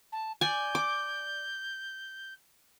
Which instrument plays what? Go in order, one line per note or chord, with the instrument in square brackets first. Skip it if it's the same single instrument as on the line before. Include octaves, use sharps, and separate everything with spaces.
[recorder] A5
[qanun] D5 G#5 [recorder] G6
[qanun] D6